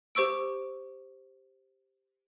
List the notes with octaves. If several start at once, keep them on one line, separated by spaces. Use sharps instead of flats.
G4 C5 C#6 E6 D7